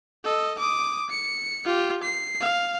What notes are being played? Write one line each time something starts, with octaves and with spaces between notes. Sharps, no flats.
A4 D#5
D6 D#6
C#7
F4 G4
C7
F5